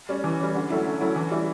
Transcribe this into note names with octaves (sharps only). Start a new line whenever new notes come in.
G3 C#4
E3
G3 C#4
D3
F#3 A3 C#4 E4
D3
F#3 A3 C#4 E4
E3
G3 C#4 E4